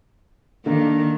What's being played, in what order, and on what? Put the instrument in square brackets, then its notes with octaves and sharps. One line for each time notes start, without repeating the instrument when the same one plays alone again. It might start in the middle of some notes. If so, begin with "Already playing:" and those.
[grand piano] D3 A#3 D4 [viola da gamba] D#3